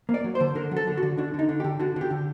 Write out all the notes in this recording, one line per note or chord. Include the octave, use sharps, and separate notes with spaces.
A#3
D5
F#3
C5
D3
D3 A#4
F#3
A4
D3
F#4
D3
D3 D4
D3 D#4
D3
G4
D3
D3 F#4
D3 G4
D3